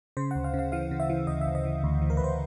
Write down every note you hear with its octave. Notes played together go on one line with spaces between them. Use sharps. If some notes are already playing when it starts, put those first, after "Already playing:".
C#3 C5
D2 F#5
F5
C#3
F5
E3 F5
C#3
E5
E3
D2 D#5
E5
D2
D#5
E3
D2
E3
A#4
B4
D2 C5